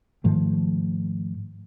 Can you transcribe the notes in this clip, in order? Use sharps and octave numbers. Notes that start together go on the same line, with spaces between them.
G#2 D#3 F3 A3